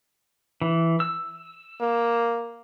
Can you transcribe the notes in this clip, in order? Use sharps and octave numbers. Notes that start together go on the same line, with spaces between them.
E3
E6
A#3